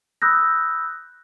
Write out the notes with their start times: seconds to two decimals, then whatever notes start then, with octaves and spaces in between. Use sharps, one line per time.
0.22 B5 D#6 E6 F#6 G6 A#6